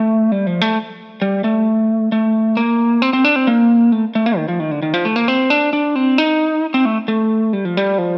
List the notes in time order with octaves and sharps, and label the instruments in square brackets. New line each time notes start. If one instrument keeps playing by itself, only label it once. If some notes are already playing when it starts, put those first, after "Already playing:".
Already playing: [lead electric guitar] A3
G3
F3
A3
G3
A3
A3
A#3
C4
C4
D4
C4
A#3
A3
A3
A#3
D#3
F3
D#3
D3
D#3
F3
A3
A#3
C4
D4
D4
C4
D#4
C4
A3
A3
G3
F3
G3
F3